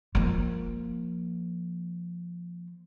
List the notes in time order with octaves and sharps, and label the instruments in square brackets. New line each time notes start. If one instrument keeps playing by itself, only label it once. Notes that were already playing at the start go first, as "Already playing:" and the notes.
[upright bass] F3 A#3